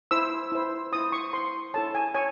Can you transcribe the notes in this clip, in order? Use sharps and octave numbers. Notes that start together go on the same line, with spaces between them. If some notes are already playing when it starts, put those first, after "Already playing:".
E4 C5 E6
E4 C5
E4 C5 D#6
C#6
E4 C5 C6
E4 A4 C#5 A5
G#5
C#5 G#5